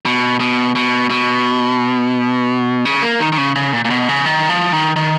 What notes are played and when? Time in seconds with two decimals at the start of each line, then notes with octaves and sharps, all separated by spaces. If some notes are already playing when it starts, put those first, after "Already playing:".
0.06 B2
0.40 B2
0.75 B2
1.10 B2
2.85 C#3
3.02 A#3
3.20 D#3
3.32 D#3
3.38 C#3
3.56 C#3
3.73 A#2
3.85 A#2
3.90 B2
4.09 C#3
4.26 D#3
4.49 F3
4.73 D#3
4.96 D#3